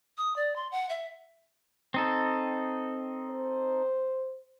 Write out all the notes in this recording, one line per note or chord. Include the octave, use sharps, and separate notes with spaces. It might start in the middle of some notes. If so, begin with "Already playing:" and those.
D#6
D5
C6
F#5
E5
C4 D#4 A4
C5